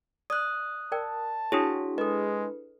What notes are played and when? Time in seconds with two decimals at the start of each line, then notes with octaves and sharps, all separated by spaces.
0.30 D5 D#6 F#6
0.92 A#4 D5 G5 A5
1.52 D4 E4 F#4 G#4 C#5 G#5 D#6
1.98 G#3 A4 B4 D#5